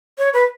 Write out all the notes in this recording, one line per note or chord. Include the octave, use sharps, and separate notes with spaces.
C#5
B4